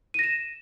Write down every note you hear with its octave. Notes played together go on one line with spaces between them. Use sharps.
A#6 D#7 E7